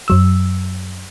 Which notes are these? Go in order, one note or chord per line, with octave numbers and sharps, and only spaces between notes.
F#2 F#3 E6